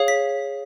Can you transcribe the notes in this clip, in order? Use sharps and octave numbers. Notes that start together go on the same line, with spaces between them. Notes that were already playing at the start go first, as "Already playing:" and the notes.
Already playing: G#4 C#5 F5
B6